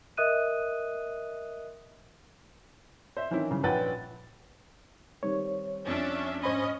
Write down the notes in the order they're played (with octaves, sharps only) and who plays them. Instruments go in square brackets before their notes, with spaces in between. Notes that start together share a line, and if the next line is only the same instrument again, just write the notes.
[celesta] A#4 D#5 E5 D#6 F#6 D#7
[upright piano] C5 E5
D#3 E3 C4 C#4 E4
G2 C#3
A#1 C#4 B4 F#5 G5 A6
[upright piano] D#3 G3 C4 [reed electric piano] C#5
[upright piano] F2 [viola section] C#4 D4 E5
[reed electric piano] G#2 C5 B5 [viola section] C#4 D#5